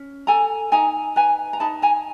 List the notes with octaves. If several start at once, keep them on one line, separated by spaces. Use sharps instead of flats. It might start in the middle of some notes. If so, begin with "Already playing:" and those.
Already playing: C#4
A4 G#5 A#5
D#4 G#5 A#5
B4 G#5 A#5
A#5
D#4 A5 B5
G#5 A#5